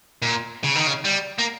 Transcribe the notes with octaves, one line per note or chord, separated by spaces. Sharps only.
A#2
C#3
D#3
C#3
G3
A#3